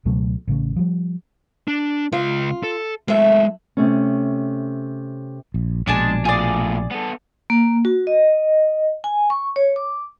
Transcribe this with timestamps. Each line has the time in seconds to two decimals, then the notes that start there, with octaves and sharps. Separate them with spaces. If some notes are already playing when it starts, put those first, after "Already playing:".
0.05 C#2 B2 F#3 A3
0.48 A1 C#3 A3
0.76 F3 G3
1.68 D4
2.12 C#2 F4 F5
2.64 A4
3.08 A2 G#3 A4 E5
3.77 C3 A3 C#4
5.54 A#1
5.87 A#1 B2 G#3 D4 G#5 A5
6.25 A2 F4 G#4 D5
6.91 B3 A4
7.50 A#3
7.85 F#4
8.07 D#5
9.04 G#5
9.30 C#6
9.56 C#5
9.76 D6